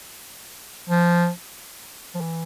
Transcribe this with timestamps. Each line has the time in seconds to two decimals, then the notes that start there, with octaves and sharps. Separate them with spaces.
0.89 F3
2.15 F3
2.21 E3